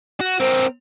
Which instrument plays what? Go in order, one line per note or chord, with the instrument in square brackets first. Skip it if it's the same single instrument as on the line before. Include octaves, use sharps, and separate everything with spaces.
[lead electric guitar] F#4
[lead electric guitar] C4 A#4 [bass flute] C5